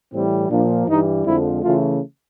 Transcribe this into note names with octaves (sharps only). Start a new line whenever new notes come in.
A2 E3 G3 C4
A#2 F3 A#3 D4
G2 E3 G3 D#4
F2 D3 F3 G#3 E4
C#3 E3 A3 F4